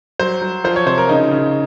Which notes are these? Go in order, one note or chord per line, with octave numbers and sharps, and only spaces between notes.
F#3 C5
F#3
F3 C5
C#5
C3 C5
A#4
C#3 D#4
C#3